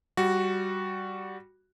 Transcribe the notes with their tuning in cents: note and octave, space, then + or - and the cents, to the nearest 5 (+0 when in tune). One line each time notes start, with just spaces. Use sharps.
G3 -10 F#4 +0